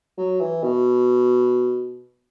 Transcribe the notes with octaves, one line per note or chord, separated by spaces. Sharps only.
F#3
E3
B2